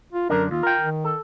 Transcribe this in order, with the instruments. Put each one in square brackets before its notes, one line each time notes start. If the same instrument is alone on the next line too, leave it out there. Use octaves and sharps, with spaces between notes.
[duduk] F4
[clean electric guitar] F#2 D3 D4 [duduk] A#4
[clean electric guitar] D#2 [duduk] F4
[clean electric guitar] A#4 G5
[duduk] D#3
[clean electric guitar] A4